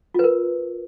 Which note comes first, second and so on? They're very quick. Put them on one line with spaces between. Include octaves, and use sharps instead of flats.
F4 B4 A#4